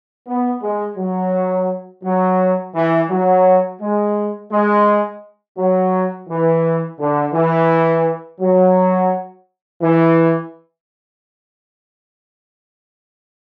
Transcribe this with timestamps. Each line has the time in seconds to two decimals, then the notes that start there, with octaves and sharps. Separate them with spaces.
0.27 B3
0.62 G#3
0.98 F#3
2.04 F#3
2.75 E3
3.10 F#3
3.81 G#3
4.52 G#3
5.57 F#3
6.29 E3
7.00 D3
7.34 E3
8.40 F#3
9.82 E3